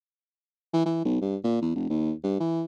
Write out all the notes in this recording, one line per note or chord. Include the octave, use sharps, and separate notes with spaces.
E3
E3
B1
G2
A#2
E2
F1
D#2
G2
E3